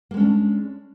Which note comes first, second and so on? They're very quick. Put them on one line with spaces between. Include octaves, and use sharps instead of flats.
A#3 G#3 C#4 D4